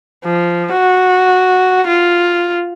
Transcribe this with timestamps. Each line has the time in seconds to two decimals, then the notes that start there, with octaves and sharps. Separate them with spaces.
0.25 F3
0.73 F#4
1.87 F4